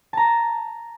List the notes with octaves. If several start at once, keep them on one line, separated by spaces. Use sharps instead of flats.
A5 A#5